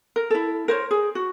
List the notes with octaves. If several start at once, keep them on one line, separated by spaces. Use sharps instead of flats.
A#4
E4 A4
A#4 C5 C#5
G#4
F#4